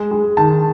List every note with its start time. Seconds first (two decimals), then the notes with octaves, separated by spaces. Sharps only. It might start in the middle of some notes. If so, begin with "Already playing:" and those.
Already playing: G#3
0.11 G#3
0.37 D#3 A5